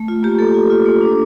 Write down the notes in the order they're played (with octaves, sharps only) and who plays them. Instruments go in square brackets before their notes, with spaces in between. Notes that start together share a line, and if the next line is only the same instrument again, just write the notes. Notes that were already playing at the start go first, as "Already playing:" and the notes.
Already playing: [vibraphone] A3
F4
A#3 G4
A#3 A4
F4
F4
A#3
D4